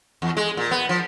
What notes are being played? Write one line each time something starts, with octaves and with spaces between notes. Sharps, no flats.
E2
G#3
A#2
B3
F3